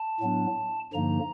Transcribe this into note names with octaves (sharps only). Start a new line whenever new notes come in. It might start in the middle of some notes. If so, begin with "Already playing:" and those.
Already playing: A5
A2 F#3 B3 D4
G2 D3 F3 A#3 D#4 A#5